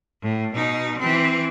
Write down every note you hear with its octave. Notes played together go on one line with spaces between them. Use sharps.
A2
B2 D#4
E3 C4